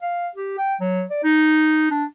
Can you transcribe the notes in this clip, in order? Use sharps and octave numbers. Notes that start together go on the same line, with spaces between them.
F5
G4
G5
F#3
D5
D#4
D4